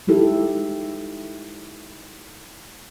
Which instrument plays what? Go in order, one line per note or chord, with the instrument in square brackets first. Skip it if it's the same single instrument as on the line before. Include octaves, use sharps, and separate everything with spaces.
[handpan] G#3 D#4 E4 G4 A4